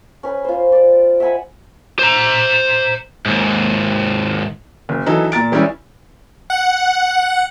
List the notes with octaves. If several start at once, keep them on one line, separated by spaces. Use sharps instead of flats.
C#4 B4
F4 C5
D5
E5 F#5 G#5 B5
C5 A#5
D#2 G#2
F#1
E3 F#3 D#4 A4
A#2 A#5 A6 D7
E3 G3 G#3 C#4 E4
F#5